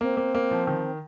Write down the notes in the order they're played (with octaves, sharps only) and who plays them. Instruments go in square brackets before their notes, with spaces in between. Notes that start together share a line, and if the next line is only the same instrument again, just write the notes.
[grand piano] A#3 [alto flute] C4
[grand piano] A#3
A#3
F3
D#3